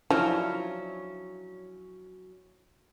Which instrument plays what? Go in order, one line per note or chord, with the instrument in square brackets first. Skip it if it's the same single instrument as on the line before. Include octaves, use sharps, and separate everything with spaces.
[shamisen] F3 [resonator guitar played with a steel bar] F#3 C#4 [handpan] D4 E4